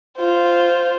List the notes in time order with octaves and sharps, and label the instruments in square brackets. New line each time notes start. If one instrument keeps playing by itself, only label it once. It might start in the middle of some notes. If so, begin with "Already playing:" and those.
[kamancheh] F4 C5